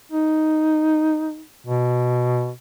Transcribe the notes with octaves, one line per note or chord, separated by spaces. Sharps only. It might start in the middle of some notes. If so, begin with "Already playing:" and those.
D#4
B2